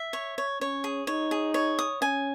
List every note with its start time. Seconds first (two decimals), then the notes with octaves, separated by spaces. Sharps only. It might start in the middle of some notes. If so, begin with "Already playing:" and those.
Already playing: E5
0.13 C#5
0.38 C#5
0.60 C#4 C#5
0.84 G#4
1.07 D#4 C#5
1.31 G#4
1.54 C#5
1.79 D#6
2.02 C#4 G#5